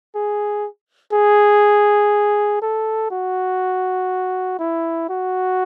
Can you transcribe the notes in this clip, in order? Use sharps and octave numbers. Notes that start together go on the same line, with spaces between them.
G#4
G#4
A4
F#4
E4
F#4